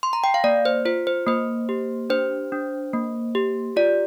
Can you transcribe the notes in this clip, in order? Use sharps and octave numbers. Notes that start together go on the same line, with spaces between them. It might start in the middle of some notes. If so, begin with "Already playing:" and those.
C6
A#5
G5
F5
A#3 D5
C5
F4 C5
C5
A#3 C5
G4
D4 C5
D4
A#3
G4
F4 D5